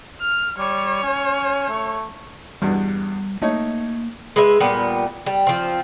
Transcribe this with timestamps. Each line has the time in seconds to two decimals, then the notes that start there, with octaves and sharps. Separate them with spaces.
0.21 F6
0.58 G3 C#5
1.03 C#4
1.69 A3
2.62 E2 G2 B2 G3
3.42 A3 A#3 D#4 C#5
4.36 G#3 B4 E5
4.60 A#2 G3 B3
5.26 G3
5.47 F3 C4